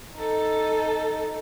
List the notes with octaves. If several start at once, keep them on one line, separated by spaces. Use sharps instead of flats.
D#4 A4